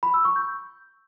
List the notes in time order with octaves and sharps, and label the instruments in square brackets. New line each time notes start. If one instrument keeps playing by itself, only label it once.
[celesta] B5
E6
C#6
G6